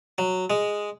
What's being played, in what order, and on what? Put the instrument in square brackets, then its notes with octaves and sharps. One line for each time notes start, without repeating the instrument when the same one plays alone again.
[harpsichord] F#3
G#3